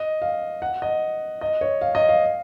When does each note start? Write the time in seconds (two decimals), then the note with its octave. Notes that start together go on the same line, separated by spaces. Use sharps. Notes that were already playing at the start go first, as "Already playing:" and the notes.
Already playing: D#5
0.22 F5
0.62 F#5
0.82 D#5
1.41 D#5
1.61 C#5
1.81 F5
1.95 D#5
2.09 F5